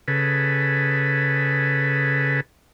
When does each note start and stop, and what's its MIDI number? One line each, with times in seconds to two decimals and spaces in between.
0.08 2.40 49
0.08 2.40 68
0.08 2.40 69
0.08 2.40 71